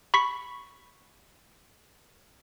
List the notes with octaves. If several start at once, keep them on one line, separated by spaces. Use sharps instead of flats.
B5 C#6 B6